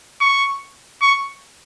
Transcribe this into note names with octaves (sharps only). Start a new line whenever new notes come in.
C#6
C#6